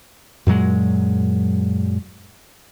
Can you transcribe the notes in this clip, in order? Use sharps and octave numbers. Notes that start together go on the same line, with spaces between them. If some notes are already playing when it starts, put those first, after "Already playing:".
F#2 A#2 F#3 G#3